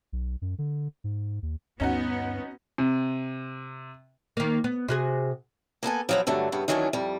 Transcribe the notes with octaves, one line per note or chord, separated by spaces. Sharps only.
B1
F#2
D3
G#2
D#2
D2 G2 B3 C#4 D#4 F#4
C3
D#3 A#3
B3
C3 F#4 G#4
A#3 B3 A4 G#5
F3 F#3 E4
G2 D3 F#3 A3
G2 C#3 B3
D#3 E3 F#3 B3 C#4 D4
F2 G3